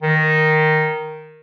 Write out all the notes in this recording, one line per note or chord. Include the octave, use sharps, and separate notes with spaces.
D#3